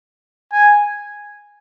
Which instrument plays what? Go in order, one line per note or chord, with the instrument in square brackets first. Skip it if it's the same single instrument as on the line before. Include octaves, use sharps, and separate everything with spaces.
[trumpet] G#5